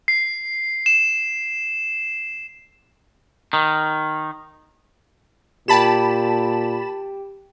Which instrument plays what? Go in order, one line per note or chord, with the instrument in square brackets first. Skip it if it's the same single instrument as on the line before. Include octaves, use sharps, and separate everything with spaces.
[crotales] C7
E7
[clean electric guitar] D#3
[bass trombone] A#2 [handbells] G4 G5 [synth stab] A5 B5 E7